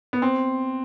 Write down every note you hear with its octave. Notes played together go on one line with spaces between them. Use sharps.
B3
C4